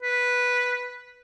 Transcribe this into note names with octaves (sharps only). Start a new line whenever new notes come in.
B4